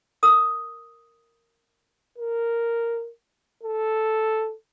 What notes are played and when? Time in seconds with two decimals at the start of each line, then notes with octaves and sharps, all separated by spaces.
0.23 A#4 D#6 E6
2.18 A#4
3.63 A4